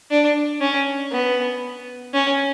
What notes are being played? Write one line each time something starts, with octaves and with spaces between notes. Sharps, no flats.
D4
C#4
B3
C#4